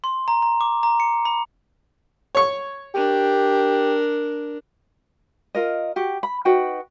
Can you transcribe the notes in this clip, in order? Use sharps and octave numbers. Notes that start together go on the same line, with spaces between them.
C6
A#5
A#5
D6
A#5
C#7
B5
C#5 C#6
D4 G4 A#4
F4 A#4 D#5
F#4 G4
B5
D#4 F#4 B4 G5